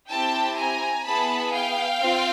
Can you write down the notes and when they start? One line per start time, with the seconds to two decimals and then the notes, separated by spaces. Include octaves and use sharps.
0.11 C4 E4 G4 G5 A5
0.58 G#5 A#5
1.06 B3 E4 G#4 A5 B5
1.54 F5 G5
2.01 C4 F4